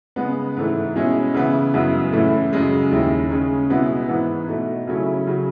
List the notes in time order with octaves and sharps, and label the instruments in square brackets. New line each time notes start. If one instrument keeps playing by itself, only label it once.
[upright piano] C#3 G#3 B3
G#2 E3 A3
B2 G#3 C#4 E4
C#3 E3 B3 E4
F#2 C#3 G#3 B3 E4
A2 E3 A3 C#4 E4
F#2 C#3 G#3
D#2 D#3 G#3 C#4 E4
C#3 G#3 C#4
B2 G#3 B3 E4
G#2 E3 B3
B2 A3 D#4
C#3 F#3 A3 C#4 E4
C#3 F#3